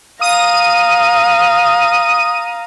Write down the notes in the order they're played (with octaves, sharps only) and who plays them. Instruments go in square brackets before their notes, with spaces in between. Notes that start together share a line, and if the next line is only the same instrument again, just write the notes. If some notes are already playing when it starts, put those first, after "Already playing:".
[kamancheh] F5 A#5 [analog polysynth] D#6 D#7